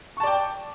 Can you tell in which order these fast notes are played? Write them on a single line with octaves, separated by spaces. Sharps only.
C#6 A5 D5 G5